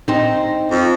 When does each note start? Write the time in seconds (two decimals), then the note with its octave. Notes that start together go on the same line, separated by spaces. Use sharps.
0.08 C4 D#4
0.71 F2